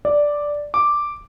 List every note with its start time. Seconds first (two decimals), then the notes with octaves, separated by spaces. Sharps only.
0.05 D5
0.74 D6